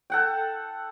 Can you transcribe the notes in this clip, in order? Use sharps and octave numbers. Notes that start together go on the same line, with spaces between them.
A4 F#5 G5